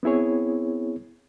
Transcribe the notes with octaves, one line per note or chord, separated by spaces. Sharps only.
B3 C4 E4 G#4 C#5